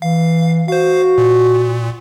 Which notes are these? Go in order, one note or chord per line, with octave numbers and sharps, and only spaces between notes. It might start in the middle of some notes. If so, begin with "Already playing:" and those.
E3 F5
F#4 C5 F5
A#2